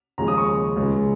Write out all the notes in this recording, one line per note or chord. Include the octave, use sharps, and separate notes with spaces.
D#2 C#3 F3 G#3 A#5
D#6
C#6
C#2 C#3 G#3